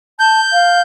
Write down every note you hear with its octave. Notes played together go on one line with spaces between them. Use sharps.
A5 G6
F5